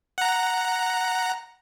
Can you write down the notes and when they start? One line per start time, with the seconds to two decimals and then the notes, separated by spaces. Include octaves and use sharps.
0.18 F#5 A#5